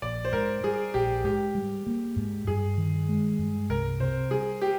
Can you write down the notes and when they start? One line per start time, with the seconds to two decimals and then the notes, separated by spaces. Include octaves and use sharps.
0.02 A#1 D5
0.25 C5
0.33 G#2 A#4
0.64 G3 G#4
0.94 A#1 G4
1.24 G#2 G4
1.55 G3
1.87 A#3
2.16 G#2
2.47 G2 G#4
2.78 D#3
3.09 G#3
3.39 G2
3.70 C2 A#4
4.00 C3 C5
4.31 G3 G#4
4.61 G4